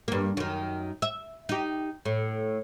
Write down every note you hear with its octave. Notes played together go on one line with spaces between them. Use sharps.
G2 A#3
F#2 D#3
E5
D#4 G4
A2